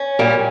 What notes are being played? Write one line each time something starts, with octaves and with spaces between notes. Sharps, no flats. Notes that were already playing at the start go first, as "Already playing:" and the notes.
Already playing: C#4
A#2 G3